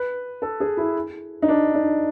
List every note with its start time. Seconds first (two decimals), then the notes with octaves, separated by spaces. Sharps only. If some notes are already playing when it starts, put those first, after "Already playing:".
Already playing: B4
0.42 A4
0.60 G#4
0.77 E4
1.42 D#4
1.48 D4
1.75 D#4